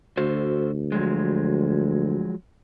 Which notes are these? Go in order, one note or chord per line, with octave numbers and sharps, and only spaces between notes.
D2 F#4 A4 C5
F3 F#3 G#3